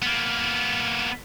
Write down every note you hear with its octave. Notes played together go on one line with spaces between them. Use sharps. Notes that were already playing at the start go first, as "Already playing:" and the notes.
A#3 B3